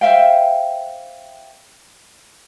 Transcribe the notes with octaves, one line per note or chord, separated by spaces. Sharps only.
C5 E5 F5 G5